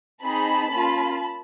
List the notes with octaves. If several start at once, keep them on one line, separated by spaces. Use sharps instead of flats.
C4 D#4 G#4 A5 B5
A#3 C#4 F4